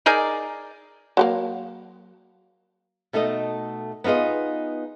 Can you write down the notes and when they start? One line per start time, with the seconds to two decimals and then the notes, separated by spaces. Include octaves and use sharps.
0.06 D#4 G#4 A#4 D5
1.17 F#3 G3 A#3
3.13 B2 A3 D#4 A4 D#5
4.04 B3 D#4 F4 G#4 D#5